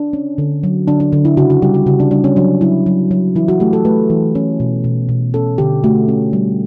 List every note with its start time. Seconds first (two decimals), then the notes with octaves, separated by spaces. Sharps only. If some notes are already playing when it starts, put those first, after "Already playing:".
Already playing: D4
0.13 C#4
0.38 D3
0.63 F#3
0.88 D3 D4
1.00 D4
1.12 D3 D4
1.25 E4
1.37 C#3 F#4
1.50 F#4
1.62 G3 G4
1.74 F#4
1.86 C#3 F#4
2.00 D4
2.11 G3 D4
2.24 C#4
2.36 F#3 D4
2.61 F#3 E4
2.86 F#3
3.11 F#3
3.35 E3 E4
3.48 F#4
3.60 A3 G4
3.73 A4
3.85 A3 B4
4.10 E3
4.35 C#4
4.60 B2
4.84 B2
5.09 B2
5.34 C#4 A4
5.58 D3 G4
5.84 A3 F#4
6.08 C#4
6.33 G3